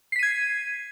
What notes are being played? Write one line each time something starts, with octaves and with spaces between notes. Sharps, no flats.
G#6 B6 C7 D#7